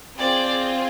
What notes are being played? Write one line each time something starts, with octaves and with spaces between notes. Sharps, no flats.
C4 F4 G#4 D5